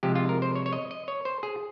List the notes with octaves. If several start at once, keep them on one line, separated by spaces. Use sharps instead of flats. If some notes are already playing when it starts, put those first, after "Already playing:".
C3 F3 G#3 G4
F4
A#4
C5
C#5
C#5
D#5
D#5
C#5
C5
G#4